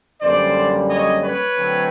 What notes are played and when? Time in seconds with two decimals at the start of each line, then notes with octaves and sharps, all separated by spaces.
0.22 F#2 D3 G3 A#3 C5 D5
0.90 C#5 D#5
1.24 B4 C#5
1.57 D3 F#3 A3 C4